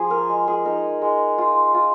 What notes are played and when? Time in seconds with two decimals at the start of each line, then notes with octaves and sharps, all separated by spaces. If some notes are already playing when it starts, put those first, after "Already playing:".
Already playing: F3 G#4
0.10 A#4
0.29 G#3
0.48 G#4
0.65 D#4 A#4
1.02 G#3
1.38 F4
1.74 F4